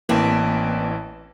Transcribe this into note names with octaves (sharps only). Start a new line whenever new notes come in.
A1 E3 A#3 C4 D4 E5